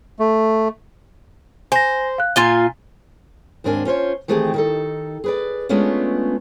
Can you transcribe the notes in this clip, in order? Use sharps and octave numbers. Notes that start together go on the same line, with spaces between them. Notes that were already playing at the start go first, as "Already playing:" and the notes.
A3
C5 G#5 A#6
F5 F#6
A#2 F4 G#5 C6 A6 G7
D#2 G#2 C4 D4 A#4 G#5
C#4 F4 C5 C#5
D#3 E3 A3 C4 G4 G#4
D#3 D#4 A4
G#4 B4 D5
G#3 A3 B3 C#4 D4 F4